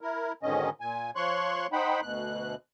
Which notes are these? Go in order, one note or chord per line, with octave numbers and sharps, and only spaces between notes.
E4 A#4
G#2 B2 D3 D#3 C#4 D#5
A#2 G#5
F3 C#5 C6 C#6 F#6
D#4 C5 F#5 G5 B5
D2 B2 F#6